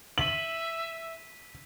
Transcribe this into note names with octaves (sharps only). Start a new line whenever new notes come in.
E5 E6 B6 D#7 F#7